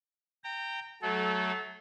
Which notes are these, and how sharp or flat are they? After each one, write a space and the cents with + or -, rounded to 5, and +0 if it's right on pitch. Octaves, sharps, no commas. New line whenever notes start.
G5 +0 A#5 -25
F#3 +0 A3 -20 A4 -30